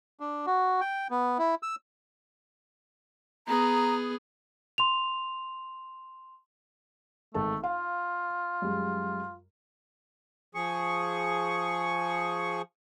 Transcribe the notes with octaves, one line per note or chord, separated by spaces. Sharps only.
D4
F#4
G5
B3
E4
E6
B3 G#4 A#5
C6 F7
G#1 A3 A4 A5
F4 F5
F#2 G3 G#3
F3 G#4 C#6